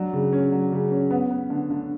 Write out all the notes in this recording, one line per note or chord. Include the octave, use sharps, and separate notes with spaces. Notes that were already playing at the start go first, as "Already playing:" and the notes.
Already playing: F#3 D4
C#3
C#4
F#3
C#3
C#4
B3
B3
D3
D3